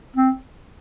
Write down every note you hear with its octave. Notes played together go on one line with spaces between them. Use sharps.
C4